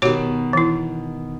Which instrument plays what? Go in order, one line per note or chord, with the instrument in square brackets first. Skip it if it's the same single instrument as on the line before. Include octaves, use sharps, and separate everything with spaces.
[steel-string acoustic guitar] B2 D#3 [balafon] F#4 G4 C#5
[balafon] E3 E4